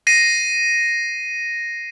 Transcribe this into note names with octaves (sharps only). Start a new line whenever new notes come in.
A#6 C7 D#7